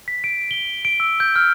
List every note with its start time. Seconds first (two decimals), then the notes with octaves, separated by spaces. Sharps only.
0.08 B6
0.24 D7
0.51 G7
0.85 D7
1.00 E6
1.20 G6
1.36 F6